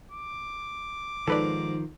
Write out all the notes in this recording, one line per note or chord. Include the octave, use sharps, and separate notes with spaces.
D6
G#2 D#3 F3 A4 B4 D5